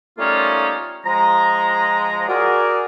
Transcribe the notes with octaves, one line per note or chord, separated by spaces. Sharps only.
G3 A3 A#3 C#4 D#4 F4
F3 G#3 A#5
F#4 G#4 A#4 D5